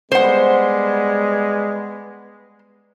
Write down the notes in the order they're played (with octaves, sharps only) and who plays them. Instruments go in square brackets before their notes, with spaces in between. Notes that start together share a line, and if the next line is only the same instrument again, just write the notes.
[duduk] G3 [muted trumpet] G#3 [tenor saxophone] B3 [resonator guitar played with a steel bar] C5 F#5